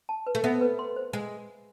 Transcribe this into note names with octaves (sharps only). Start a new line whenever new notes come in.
A5
B4
A3
B3 E5
B4
C6
C5
G#3 G#5